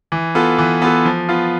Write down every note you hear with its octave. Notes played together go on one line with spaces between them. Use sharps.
E3
B3 F4 A4
E3
B3 F4 A4
F3
B3 F4